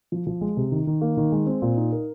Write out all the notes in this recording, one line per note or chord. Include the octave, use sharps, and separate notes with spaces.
F3
F3
G#3
C3
D#3
D#3
A#3
D#3
G#3
C4
A#2
D#4
A#4